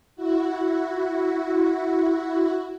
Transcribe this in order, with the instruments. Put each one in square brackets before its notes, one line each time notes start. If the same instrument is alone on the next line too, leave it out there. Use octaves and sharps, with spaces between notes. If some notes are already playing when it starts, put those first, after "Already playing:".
[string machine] E4 F#4